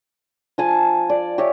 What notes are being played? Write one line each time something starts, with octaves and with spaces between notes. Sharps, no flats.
F3 G#5 A5
D5
G4 C#5 E5